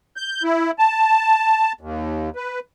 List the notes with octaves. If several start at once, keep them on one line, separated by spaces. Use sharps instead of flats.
G6
E4
A5
D#2
B4